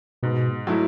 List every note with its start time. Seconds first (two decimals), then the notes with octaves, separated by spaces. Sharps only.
0.23 G#2 B2
0.67 F#3 A3 E4